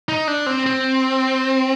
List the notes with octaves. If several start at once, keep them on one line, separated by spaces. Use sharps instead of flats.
D#4
D4
C4
C4